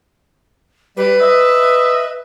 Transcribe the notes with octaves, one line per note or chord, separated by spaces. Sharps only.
G3 B4
D#5 E5